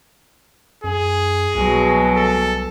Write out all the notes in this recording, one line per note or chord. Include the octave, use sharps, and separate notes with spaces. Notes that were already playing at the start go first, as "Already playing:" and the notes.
F#2 G#4
C2 B2 F#3 G#3
A4